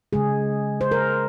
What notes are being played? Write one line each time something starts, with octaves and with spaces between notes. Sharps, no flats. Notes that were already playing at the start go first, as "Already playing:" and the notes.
C#3 G#3 G#4
C5
A#4